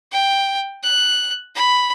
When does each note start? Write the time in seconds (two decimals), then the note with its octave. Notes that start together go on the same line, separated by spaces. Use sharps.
0.12 G5
0.83 F#6
1.55 B5